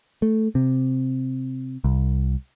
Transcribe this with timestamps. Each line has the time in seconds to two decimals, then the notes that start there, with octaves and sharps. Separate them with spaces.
0.22 A3
0.55 C3
1.84 C2